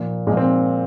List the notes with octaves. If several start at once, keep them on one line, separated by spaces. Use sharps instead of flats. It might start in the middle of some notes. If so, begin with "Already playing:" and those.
Already playing: A#2 F3
A#2 F3 G#3
C4